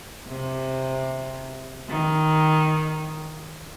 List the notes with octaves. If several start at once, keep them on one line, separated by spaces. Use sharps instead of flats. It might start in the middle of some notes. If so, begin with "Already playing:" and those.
C3
D#3